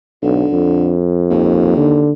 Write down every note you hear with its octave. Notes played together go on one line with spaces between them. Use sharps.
B1 D3
F2
D#2
D3